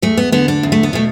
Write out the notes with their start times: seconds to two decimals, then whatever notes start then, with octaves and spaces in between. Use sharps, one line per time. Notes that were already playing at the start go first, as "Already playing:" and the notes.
0.02 E2 A3
0.17 B3
0.32 D3 B3
0.48 D4
0.63 E2
0.72 A3
0.83 B3
0.93 B2 A3